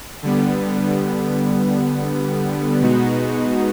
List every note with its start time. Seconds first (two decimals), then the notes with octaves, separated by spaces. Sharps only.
0.23 D3 G3 B3
2.81 B2 G#3 B3 D#4 F#4